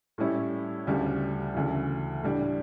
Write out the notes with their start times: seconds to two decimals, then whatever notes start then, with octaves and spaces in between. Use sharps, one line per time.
0.18 A2 G3 C#4 E4
0.87 D2 C#3 G3
1.54 D2 C#3 E3
2.23 A2 G3 D4